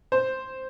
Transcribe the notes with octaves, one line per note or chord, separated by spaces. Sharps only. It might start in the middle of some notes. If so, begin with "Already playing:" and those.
C5